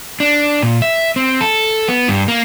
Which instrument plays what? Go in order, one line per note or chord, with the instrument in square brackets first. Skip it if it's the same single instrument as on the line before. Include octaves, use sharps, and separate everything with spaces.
[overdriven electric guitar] D4
A#2
E5
C4
A4
B3
G2
A#3